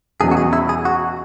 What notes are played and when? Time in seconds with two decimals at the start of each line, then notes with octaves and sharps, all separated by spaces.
0.21 E2 B2 F#3 C#4 G#4
0.31 F#4
0.37 G#4
0.53 E4
0.69 G#4
0.85 F#4